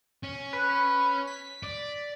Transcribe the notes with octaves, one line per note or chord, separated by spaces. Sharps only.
C#4
B4
B6
D5